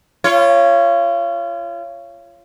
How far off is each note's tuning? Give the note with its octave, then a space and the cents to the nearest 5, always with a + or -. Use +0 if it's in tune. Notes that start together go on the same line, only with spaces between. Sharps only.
F4 -30 C#5 +0